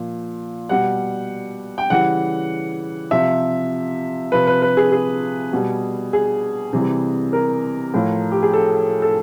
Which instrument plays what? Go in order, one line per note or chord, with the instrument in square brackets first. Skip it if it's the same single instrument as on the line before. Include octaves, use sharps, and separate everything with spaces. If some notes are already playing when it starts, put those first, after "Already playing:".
Already playing: [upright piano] A#2 F3
B2 G3 F#5
G5
C#3 E3 G3 F#5
C3 F3 E5
C3 F3 B4
B4
B4
G#4
G#4
B2 G3
G#4
C3 E3 G3
A#4
A2 F3
G4
G#4
A4
A4